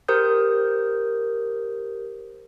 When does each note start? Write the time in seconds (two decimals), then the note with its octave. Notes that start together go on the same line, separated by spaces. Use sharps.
0.08 G4 A#4 C5 D#6 G6